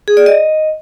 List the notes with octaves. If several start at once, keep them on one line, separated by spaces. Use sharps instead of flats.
G#4
D5
D#5